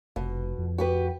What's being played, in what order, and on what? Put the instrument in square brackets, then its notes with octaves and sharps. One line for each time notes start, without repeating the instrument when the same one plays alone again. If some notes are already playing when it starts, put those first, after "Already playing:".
[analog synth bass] F1 [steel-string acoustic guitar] B2
[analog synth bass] F2
[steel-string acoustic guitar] F#4 G4 B4